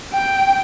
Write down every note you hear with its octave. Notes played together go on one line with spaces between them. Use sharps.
G5